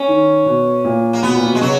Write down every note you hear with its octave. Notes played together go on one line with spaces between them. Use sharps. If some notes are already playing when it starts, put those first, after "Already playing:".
Already playing: C#4
D#3
B2
A#2
A#3
B2 B3
A#2
B2
G#3
C#3 F#3